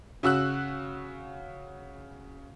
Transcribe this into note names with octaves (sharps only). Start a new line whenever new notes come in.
C#3 F#4 E6 F#6